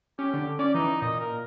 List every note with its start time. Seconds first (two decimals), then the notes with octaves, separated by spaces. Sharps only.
0.19 C#4 G4
0.34 D3
0.59 C#4 D5
0.75 E3 D#4
1.02 A#2 D#5
1.20 A#4